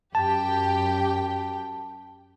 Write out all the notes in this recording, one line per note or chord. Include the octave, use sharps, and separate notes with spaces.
F#2 G4 G5 A5